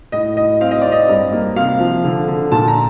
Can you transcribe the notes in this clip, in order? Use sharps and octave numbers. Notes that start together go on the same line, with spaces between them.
A2 D#5
A2 D#5
C4 F5
D#5
C4 D5
D#5
G2
A#3
C3 F5
F3
D3
D3
A#2 A5
A#5